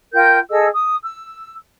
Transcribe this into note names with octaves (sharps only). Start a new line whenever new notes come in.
F4 A#4 G5 G6
G#4 A4 D#5 E6
D#6
E6